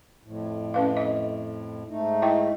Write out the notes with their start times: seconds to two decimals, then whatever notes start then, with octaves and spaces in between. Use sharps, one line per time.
0.24 F2 A2
0.74 C#4 B4 F5
0.97 D#5
1.89 G#2 A3 D#4
2.22 E4 D#5 G5